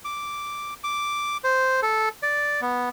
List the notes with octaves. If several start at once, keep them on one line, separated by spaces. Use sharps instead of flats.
D6
D6
C5
A4
D5
B3